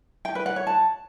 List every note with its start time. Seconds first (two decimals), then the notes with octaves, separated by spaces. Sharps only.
0.25 G5
0.35 B4
0.46 F#5
0.56 C#5
0.67 A5